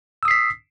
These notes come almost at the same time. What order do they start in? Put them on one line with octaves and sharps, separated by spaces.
E6 D#6 C7 B6